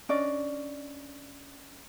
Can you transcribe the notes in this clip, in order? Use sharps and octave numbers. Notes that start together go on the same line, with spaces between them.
C#4 D4 D5 D#5